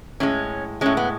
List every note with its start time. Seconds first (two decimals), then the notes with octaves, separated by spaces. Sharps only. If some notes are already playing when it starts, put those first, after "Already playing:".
0.20 A2 G#3 C#4
0.81 A2 G#3 C#4
0.97 B3